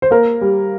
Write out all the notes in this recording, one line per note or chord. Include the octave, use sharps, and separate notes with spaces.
C5
A#3 A#4
G3